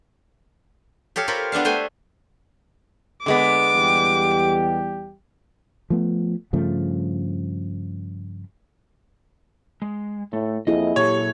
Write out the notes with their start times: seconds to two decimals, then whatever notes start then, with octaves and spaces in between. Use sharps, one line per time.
1.16 G4 A4 C#5 F5
1.28 F4 A#4 C5 C#5 B5
1.52 B3 D4 E5 F5
1.65 A3 C5 G5 G#5
3.26 D3 G#3 B3 D6
3.74 E2 G3 G4
5.90 F3 A3 B3
6.53 G2 C#3 F3 A3
9.82 G#3
10.33 A2 A3
10.67 F2 A#3 E4 G#4 D#5
10.96 A#2 F#3 G4 A4 C#5